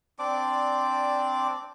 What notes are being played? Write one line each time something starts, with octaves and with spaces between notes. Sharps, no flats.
C4 D4 D5 D6